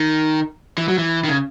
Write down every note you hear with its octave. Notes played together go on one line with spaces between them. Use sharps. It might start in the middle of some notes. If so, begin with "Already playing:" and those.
Already playing: D#3
E3
F#3
E3
D#3
C#3